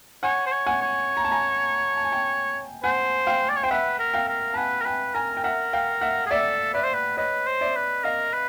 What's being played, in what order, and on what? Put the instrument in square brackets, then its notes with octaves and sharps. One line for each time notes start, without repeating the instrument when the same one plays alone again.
[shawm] C#5 [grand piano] F#5 G#5
[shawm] C5
C#5
[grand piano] F#5 G#5
[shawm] C#5
[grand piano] A#5
A5
G#5 A#5
A5
G#5
G5 A5
[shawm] C5 [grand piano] F#5 G#5
[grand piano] F5 G5
[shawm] D5
C#5
[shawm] C5 [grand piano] G5
[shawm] B4 [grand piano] E5 F#5
[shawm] A#4
[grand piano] F5 G5
[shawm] A#4
[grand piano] A5
[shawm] B4 [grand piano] F#5 G#5
[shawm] A#4
[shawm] B4 [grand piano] G5 A5
[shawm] A#4 [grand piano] G#5 A#5
[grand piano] G5
[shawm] A#4 [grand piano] E5 F#5
[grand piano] F5 G5
E5 F#5
[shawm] G#4
[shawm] A4 [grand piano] D5 E5
[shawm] B4 [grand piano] D5 E5
[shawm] C5
B4
[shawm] B4 [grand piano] C#5 D#5
[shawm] C5
[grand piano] D5 E5
[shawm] B4
[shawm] A#4 [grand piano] D#5 F5
[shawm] B4